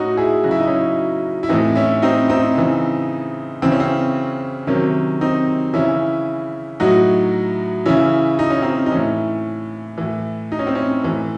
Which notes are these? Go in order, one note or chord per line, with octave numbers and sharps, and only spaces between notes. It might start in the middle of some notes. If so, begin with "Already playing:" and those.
Already playing: A2 C#4 D#4 F#4
E4 G#4
C#3 F#3 F#4
E4
D#4
C#4 E4
E4
A2 E3 C4 D#4
C#4 E4
C4 D#4
C4 D#4
C#3 E3
C#3 E3 C4
C#4
C4
C3 D#3 F#3 C#4
C4 D#4
C#3 E3 C#4 E4
A2 F#3 D#4 F#4
C#3 E3 C#4 E4
D#4
C#4
C4 D#4
D#4
A2 E3 C#4
A2 E3
D#4
C#4
C4
C#4
A2 E3